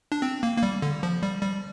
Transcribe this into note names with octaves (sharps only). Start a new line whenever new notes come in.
D4
C4
A#3
A#3
G3
D3
F3
G3
G3